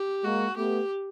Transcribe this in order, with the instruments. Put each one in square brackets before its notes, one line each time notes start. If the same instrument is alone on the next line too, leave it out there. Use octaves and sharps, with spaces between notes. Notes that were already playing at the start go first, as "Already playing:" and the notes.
Already playing: [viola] G4
[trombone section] G#3 A#3 [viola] F#4
[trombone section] A3 B3 [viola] G4